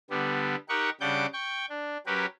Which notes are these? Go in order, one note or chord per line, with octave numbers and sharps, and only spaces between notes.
D3 G3 B3
D#4 G4 A#4 F#5 C#6
C#3 G3 D4 F#5 D6 G6
G5 C#6
D4
F#3 C#4 G4 A#4 B4